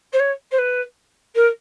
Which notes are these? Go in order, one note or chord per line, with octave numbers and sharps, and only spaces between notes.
C5
C#5
C5
B4
A#4